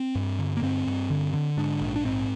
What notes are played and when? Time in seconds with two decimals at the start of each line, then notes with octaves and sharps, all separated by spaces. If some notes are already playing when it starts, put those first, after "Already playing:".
Already playing: C4
0.15 G2
0.39 D3
0.57 A#3
0.62 G2 C4
0.87 G2
1.10 D3
1.34 D3
1.57 G#2 D4
1.81 A#1
1.96 D4
2.05 G#2 C4